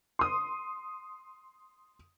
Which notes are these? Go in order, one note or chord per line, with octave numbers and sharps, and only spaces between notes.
C6 D#6